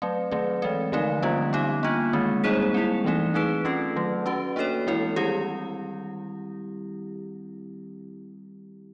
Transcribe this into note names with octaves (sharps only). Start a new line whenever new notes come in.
F#3 A3 C4
D#3 F#3 A3 C4
E3 G#3 C4
D3 F3 A3 C4 D#4
D3 G3 A#3 C#4 F4
B3 D#4 G4
A#3 D4 F4
D#3 G#3 C4
G3 A#3 D#4 G#4 C5
C4 E4 G#4
E3 A3 C4 D#4
C4 D#4 G#4 B4
A3 C#4 F4 A4
D#3 F#3 A3
A3 C#4 F#4 B4
A#3 D4 F#4 A4 C#5
E3 G#3 C4 E4 A4
D#3 G3 C4 E4 G4